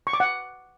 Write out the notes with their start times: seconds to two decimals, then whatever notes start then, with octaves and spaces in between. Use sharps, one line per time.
0.07 C#6
0.13 D6
0.20 F#5